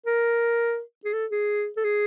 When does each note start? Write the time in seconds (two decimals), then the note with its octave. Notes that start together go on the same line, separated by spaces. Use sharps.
0.06 A#4
1.05 G#4
1.13 A4
1.31 G#4
1.77 A4
1.84 G#4